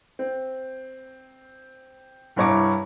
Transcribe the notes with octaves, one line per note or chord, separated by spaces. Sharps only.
C4
C2 G2 E4 C#5 A#5 D6